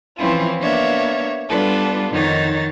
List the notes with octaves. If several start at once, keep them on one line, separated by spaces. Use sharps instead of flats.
E3 F3 C4 C#4 E4 F4
A#3 B3 D4 C#5 E5 F5
G3 B3 D4 F4 A4 B4
F2 D#3 D#4 C#5 F#5 A6